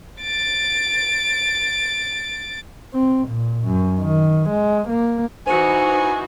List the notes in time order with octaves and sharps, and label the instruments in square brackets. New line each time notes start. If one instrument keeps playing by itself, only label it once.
[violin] A6 D7
[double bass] C4
A#2
F#2
D#3
G#3
A#3
[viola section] E3 D#4 F#4 [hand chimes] C5 C#7 [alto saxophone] G#5